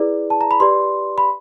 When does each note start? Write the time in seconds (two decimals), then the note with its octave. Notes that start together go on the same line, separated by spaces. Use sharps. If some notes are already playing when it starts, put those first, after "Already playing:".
Already playing: E4 G#4 B4 D5
0.30 A5
0.41 A#5
0.51 B5
0.60 G4 B4 D5 C6
1.18 B5